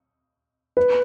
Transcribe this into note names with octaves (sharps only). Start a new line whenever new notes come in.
B4